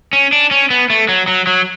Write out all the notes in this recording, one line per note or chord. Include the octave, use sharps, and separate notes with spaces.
C#4
D4
C#4
B3
A3
F#3
F#3
F#3